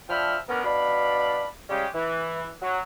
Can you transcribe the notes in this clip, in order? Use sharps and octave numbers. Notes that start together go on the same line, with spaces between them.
F3 D4 E5 G5 B5 F6
B3 C#4 D4 A#4
B2 D4 D5 F5 B5
C#3 G3 G#3 C#4 G4
E3
F#3